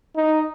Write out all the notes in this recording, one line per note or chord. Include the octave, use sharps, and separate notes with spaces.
D#4